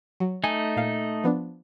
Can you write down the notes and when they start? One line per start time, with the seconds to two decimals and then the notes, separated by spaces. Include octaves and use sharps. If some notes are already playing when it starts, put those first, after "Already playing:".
0.20 F#3
0.44 A3 D#4 G#5
0.76 A#2 F5
1.24 F3 B3 D4